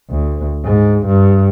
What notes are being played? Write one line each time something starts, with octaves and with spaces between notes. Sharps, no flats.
D2
G#2
G2